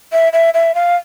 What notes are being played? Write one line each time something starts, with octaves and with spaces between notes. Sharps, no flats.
E5
E5
E5
F5